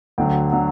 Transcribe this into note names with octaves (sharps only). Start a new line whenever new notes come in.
D2 D3 F#3 G5
D3 F#3